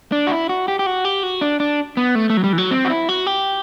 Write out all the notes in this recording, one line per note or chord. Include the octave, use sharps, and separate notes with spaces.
D4
F#4
E4
F#4
G4
G4
F#4
G4
F#4
D4
D4
B3
A3
A3
F#3
G3
E3
F#3
C4
F#4
E4
F#4
G4